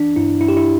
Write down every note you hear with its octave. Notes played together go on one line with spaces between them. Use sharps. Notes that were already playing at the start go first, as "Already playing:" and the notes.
Already playing: E3 D4
G2 E4
G2 E4
G4
E4